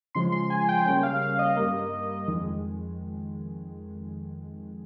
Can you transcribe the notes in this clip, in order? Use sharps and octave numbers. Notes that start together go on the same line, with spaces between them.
C#3 F3 G#3 C6
C6
G#5
G5
C#3 G3 A#3 C#4 G5
F5
F5
D#5
G2 G3 A#3
F2 D#3 G#3